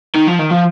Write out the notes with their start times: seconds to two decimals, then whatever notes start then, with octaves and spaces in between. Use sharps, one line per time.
0.16 D#3
0.28 F3
0.39 D#3
0.51 F3